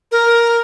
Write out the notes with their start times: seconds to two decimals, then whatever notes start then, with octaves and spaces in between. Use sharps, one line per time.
0.12 A#4